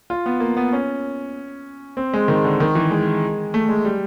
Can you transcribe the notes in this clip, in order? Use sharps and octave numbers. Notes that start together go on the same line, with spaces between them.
F4
B3
A#3
B3
C#4
C4
G#3
D#3
D3
D#3
E3
G#3
A3
G#3
G3